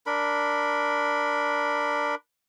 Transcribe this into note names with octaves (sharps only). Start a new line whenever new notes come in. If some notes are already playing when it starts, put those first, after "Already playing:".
D4 A#4 B5